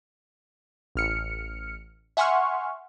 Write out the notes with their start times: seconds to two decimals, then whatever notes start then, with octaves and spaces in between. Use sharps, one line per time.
0.95 A1 F6 C#7
2.17 E5 F#5 G#5 C6 C#6 F6